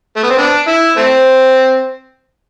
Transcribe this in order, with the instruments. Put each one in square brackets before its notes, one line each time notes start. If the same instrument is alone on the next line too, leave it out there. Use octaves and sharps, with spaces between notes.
[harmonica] A3
B3
C4
B3 D4
E4
A3 C4